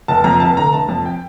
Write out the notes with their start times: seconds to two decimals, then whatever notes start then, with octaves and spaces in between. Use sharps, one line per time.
0.08 F1 A5
0.24 F2 A#5
0.40 F1 A5
0.57 D3 A#5
0.73 F1 A5
0.89 F2 A5
1.05 G5